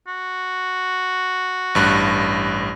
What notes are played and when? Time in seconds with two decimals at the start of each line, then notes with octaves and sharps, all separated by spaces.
0.08 F#4
1.75 A1 G2 F#6